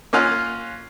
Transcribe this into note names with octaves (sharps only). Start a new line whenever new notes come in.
A#3 C#4 F4 F5 F#5